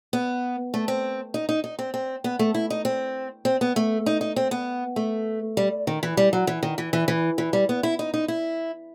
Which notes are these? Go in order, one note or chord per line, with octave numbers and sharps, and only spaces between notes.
B3
A3
C4
D#4
D#4
D#4
C4
C4
B3
A3
E4
D#4
C4
C4
B3
A3
D#4
D#4
C4
B3
A3
G3
D#3
E3
G3
F#3
E3
D#3
E3
E3
E3
E3
G3
B3
E4
D#4
D#4
E4